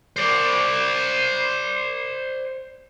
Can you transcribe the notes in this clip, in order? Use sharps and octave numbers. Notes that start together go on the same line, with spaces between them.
C5 D5